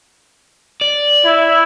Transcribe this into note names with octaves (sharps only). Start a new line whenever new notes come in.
D5
E4